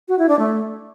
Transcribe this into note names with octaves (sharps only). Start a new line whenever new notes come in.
F#4
E4
D4
A3